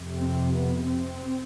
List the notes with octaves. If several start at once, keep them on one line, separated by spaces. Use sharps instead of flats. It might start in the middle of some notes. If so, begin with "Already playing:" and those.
Already playing: F2 C3
C4
B3
C4